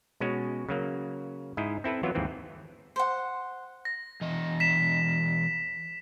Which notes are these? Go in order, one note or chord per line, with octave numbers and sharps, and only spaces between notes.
B2 G#3 C#4 F#4
C#3 F#3 A#3
G#2 E4 D#5
C4 E4 A4 B4
E3 F#3 B3 F4
D#2 G#2 E3 C4
C5 F#5
A#6
B2 E3 D#5
B6 E7